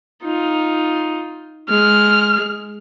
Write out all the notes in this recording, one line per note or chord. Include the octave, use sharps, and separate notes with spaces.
D#4 F4
G#3 F6